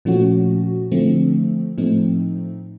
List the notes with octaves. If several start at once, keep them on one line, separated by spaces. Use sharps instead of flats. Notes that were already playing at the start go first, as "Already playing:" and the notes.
A#2 F3 A3 C#4 F#4
D3 F3 A3 C4
A2 F3 A3 C4 D#4